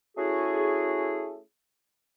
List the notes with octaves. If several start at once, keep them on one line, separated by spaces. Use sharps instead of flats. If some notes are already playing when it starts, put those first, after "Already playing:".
A3 C#4 E4 F#4 G#4